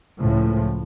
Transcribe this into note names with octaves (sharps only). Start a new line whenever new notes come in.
C#2 A2 F3